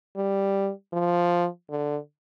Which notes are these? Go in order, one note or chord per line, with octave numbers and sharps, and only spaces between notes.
G3
F3
D3